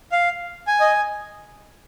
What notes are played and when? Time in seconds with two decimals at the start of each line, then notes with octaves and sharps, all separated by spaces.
0.12 F5
0.67 G#5
0.80 D#5